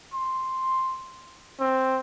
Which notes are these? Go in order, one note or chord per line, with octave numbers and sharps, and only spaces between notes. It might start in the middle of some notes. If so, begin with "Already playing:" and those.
C6
C4